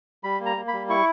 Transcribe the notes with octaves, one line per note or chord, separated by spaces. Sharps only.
G3 B5
A#3
A#5
A#3
B5
G3
E4 C#6